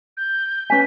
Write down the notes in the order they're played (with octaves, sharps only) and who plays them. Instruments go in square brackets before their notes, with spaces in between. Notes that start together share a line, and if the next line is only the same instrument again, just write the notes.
[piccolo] G6
[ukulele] C#4 B4 G#5 [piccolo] B6